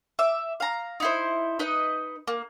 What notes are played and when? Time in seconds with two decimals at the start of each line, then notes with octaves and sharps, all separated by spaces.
0.19 E5 D6
0.60 F5 A#5
1.00 D#4 E4 C5
1.59 D#4 B4 D#5
2.27 A#3